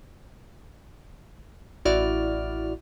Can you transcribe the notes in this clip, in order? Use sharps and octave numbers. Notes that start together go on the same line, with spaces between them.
A1 E4 F#4 D5 F6